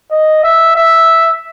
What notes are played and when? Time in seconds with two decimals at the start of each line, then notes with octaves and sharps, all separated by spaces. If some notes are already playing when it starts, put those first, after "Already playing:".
0.11 D#5
0.44 E5
0.76 E5